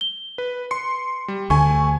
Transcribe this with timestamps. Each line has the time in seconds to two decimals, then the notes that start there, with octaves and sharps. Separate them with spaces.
0.01 G7
0.38 B4
0.71 C6 C#7
1.28 G3
1.50 D2 A3 G#5 C#6